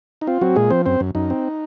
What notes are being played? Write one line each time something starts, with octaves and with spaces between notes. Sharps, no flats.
D#4
C4 F4
F#3 C4 F#4
A#2 G#3 G#4
F3 C4 C5
F#2 C4 C5
F#2
F#2 D#4
C4